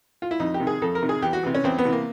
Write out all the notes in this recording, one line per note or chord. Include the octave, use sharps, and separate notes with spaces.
F4
E4
F2 D#4
G4
C3 D#3
G#4
F2 A4
A#4
C3 D#3
G#4
E2 G4
F#4
C3 E3
C#4
E2 C4
B3
C3 E3
A#3